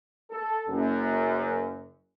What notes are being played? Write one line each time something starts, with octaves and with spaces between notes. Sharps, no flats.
A4
F#1 F#2